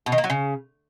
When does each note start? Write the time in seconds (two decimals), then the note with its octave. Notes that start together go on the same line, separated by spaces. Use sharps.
0.06 B2
0.12 D#3
0.18 A#3
0.24 F#3
0.30 C#3